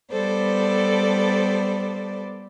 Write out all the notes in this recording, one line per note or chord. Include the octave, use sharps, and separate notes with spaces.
G3 B3 A4 C5 D5